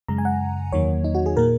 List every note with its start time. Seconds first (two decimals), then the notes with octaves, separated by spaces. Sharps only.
0.08 F#2 C#3 G#3 A#5
0.18 G#5
0.25 F#5
0.72 E2 D#3 F#3 A#3 C#5
1.04 D#4
1.15 F#4
1.26 G#4
1.37 A#2 A#3 A#4